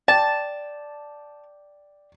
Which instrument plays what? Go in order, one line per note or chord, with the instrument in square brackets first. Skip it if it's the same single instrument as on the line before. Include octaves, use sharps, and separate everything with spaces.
[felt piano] D5 G5 [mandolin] A5